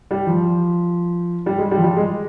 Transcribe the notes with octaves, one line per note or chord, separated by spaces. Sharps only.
G3
F3
G3
G#3
G3
F3
G3
G#3